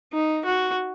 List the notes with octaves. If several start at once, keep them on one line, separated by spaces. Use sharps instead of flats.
D#4
F#4